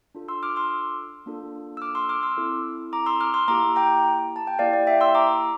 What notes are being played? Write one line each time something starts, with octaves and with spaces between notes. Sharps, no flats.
D4 F4 A4
C6 E6
D6 F6
C6 E6
A#3 D4 F4 A4
E6
D6 F6
C6 E6
D6 F6
C6 E6
C4 E4 A4
A#5 D6
C6 E6
D6 F6
C6 E6
A#3 E4 G4 A#5 D6
G5 A#5
A5
G5
A#3 E4 G4 D5 F5
D5
E5 G5
C6 E6
A#5 D6